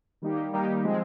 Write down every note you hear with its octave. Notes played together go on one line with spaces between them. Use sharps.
D#3 G3 A#3 D#4 G4
D#3 G3 A#3 D#4 G4
F3 G#3 C4